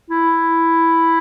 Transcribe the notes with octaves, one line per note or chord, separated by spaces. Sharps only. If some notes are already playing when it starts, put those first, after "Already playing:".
E4